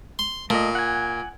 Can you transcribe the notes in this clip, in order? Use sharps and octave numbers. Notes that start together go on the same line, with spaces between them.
C6
A#2 A3 D#5
F#5 G#5